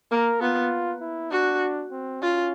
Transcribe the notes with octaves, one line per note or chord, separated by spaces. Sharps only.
A#3 A#4
B3 F4
E4
D4 F#4
C4
C#4 F4